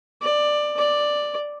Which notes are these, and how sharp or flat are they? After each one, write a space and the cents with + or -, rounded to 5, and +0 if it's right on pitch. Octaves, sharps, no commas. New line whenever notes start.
D5 +15
D5 +5